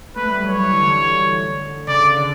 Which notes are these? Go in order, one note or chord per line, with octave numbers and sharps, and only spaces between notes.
A3 B4
G3
F#3 C#5
E3
D3
C#3 D5
D3